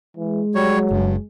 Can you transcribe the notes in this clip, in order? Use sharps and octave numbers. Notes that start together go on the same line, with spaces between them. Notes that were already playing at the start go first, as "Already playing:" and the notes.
E3 G#3
F#3 G3 C#5
F#1 G2